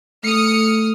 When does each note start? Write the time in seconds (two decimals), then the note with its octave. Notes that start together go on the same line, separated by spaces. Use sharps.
0.24 A3 D#6 F6 C#7